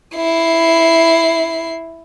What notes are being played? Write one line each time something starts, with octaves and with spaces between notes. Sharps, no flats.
E4 C7